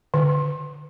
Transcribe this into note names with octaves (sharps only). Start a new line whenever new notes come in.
D3